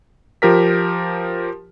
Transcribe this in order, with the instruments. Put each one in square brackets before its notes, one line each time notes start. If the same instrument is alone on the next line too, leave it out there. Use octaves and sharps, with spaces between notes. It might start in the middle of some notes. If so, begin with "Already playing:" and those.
[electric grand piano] F3 G4 A#4 B6